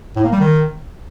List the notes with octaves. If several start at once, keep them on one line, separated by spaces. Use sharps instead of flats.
A2
A#3
G3
D#3